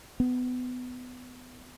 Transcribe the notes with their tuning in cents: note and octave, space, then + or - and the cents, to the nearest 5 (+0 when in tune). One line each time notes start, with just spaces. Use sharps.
B3 +25